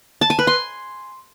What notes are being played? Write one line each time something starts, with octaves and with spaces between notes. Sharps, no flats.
A5
G#5
B4
C6